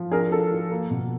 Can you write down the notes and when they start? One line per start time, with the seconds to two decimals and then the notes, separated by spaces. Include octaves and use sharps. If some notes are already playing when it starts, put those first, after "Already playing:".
Already playing: F3
0.11 D4 G#4 A#4
0.31 F3 A4
0.52 F3
0.71 A#3
0.91 B2